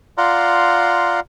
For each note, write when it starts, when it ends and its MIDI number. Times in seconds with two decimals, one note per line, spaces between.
0.18 1.20 65
0.18 1.20 74
0.18 1.20 77
0.18 1.20 78
0.18 1.20 82
0.18 1.20 84